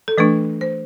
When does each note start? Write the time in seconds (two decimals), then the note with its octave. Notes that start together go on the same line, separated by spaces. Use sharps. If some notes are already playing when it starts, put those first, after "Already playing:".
0.08 A4
0.18 E3 A3 D4 B4
0.61 C5